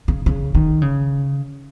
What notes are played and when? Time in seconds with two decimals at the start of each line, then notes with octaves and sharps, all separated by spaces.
0.08 C#3
0.26 C#3
0.55 D#3
0.82 C#3